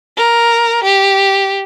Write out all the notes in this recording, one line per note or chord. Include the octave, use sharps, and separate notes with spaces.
A#4
G4